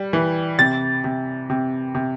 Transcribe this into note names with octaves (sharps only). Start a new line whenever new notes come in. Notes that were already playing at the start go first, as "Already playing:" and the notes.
Already playing: G3
E3
C3 A6
C3
C3
C3